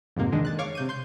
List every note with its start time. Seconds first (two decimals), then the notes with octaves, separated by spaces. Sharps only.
0.16 F2 G#2 C3 A#3
0.32 D3 D#3 G#3 D4
0.45 F#6 A6
0.59 C#5 F5 C#6 D6
0.75 C3 G6 D#7
0.89 C6 G6